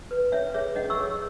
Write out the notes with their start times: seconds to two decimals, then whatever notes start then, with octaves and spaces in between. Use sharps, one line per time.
0.11 B4
0.32 C#4 C#5 E5
0.54 G#4 C#5 E5
0.76 C#4 D#5 F#5
0.90 C#6 E6
0.96 G#4 C#5